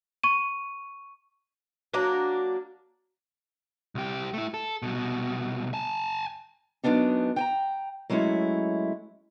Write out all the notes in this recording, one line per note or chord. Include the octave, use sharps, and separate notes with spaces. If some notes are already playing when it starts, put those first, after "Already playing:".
C#6 D#7
F#3 A#3 D4
C2 G4
A3 E4
A4
C2 B2
G#5 A5
F#2 B2 B3 D4 D#4
G5 G#5 A#5
F#3 G#3 A3 C#4 E4